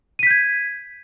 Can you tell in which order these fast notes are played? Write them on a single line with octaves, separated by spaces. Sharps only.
D#7 B6 G6 G#6